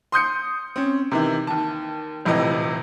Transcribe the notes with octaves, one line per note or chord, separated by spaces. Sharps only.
C6 D#6 G6 C#7
C4 C#4
C3 D#3 E3
D#2 A5
D#1 F2 A2 C3 E3 D#5